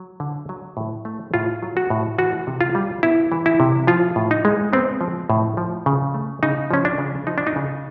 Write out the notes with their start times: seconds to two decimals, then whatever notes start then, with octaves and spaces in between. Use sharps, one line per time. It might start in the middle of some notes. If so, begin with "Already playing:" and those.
Already playing: F#3
0.20 D3
0.49 F#3
0.77 A2
1.05 A3
1.34 A2 F4
1.63 F#3
1.77 F#4
1.90 A2
2.18 E3 F#4
2.47 C3
2.61 F4
2.75 G3
3.03 B3 E4
3.32 E3
3.46 E4
3.60 C3
3.87 F3 F4
4.16 A2
4.31 D#4
4.45 G#3
4.73 B3 C4
5.01 F3
5.30 A2
5.57 F3
5.86 C#3
6.14 A3
6.43 C#3 D#4
6.71 F3 C#4
6.85 D4
6.98 C#3
7.27 F3 D#4
7.38 D4
7.47 D#4
7.56 C#3